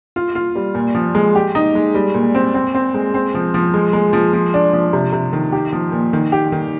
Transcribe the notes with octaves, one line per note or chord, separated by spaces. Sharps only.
F4
F4
G3
A#2
F3
G#3
G4
D#4
G#3
G3
A#2
C4
C4
C4
G#3
C4
F3
F3
G#3
G#3
F3
F3
D4
F3
C3
C3
D#3
G4
F3
A#2
D#3
G4
D#3